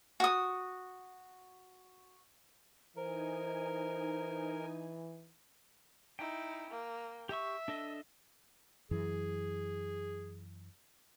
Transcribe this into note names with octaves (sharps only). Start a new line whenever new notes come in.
F#4 D#6
E3 D#4 A#4 C5 G#5
D#4 E4 G5
A#3
G4 E5 C#6
D4 A4 D#5
F#2 E3 G#4